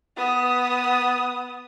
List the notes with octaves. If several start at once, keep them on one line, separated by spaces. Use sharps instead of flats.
B3 D#6